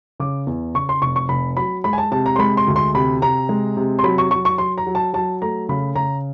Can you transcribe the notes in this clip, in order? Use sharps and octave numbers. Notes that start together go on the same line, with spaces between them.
C#3 D6
E2
C#3 C#6
C6
F1 C#6
C#6
F1 B5
F#3 B5
G#3 B5
G#5
A5
C3 A5
A#5
C6
G#3 B5
C6
D2
C6
C3 B5
C3 A#5
G#3
C3
C6
F#3 B5
C#6
F#3 C#6
C#6
F#3 C6
A#5
F#3
A5
F#3 A5
A3 A#5
C#3 B5
C#3 A#5